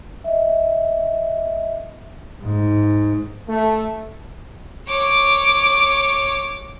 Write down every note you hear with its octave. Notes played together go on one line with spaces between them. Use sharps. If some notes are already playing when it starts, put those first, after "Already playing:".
D#5 E5
G#2
A3
C#5 D6